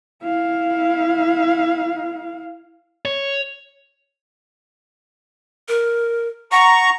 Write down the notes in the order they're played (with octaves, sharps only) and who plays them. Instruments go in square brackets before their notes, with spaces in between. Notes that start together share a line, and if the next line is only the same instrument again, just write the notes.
[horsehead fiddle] E4 F5
[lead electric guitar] C#5
[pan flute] A#4
[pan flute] F#5 [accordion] A#5 C#6